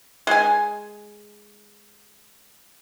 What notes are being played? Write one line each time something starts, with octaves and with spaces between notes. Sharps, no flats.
G#3 G#5